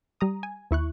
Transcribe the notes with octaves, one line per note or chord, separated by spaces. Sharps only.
G3 A#5 D#6
G#5
D#2 E4 C#6 F#6